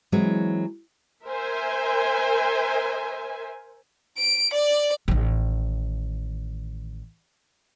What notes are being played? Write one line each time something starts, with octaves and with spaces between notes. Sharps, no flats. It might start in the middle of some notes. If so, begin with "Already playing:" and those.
E3 F#3 G#3 C4 F#4
A#4 C5 E5 G#5
D7
D5
A1 D#3